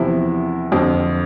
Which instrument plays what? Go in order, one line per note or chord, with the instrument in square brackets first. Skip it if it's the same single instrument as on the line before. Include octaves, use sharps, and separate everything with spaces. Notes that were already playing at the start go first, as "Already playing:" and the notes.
Already playing: [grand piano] E2 C3 F3 E4
F2 D3 F3